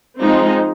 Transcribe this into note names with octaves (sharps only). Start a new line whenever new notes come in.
F3 G#3 C4 D#4